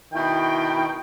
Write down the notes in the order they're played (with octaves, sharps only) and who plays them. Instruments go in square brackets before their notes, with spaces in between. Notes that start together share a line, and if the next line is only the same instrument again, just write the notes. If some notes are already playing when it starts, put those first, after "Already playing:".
[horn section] B2 D#3 E4 G5